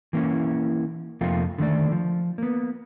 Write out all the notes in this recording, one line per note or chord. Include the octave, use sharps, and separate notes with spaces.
E3 A#3 C#4 E4
F2 C3 F3 A3 A#3 F4
D3 D#3 A3 D5
F3
A#3 B3